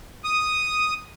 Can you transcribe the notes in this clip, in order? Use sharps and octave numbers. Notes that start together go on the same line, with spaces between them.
D#6